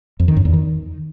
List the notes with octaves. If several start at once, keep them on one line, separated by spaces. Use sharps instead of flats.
F2
D#3
F#2
E2
D#3